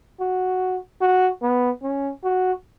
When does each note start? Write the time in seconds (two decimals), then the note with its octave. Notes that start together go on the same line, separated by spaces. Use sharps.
0.20 F#4
1.01 F#4
1.42 B3
1.83 C#4
2.24 F#4